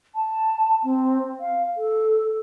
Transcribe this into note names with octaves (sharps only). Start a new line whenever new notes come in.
A5
C4
F5
A4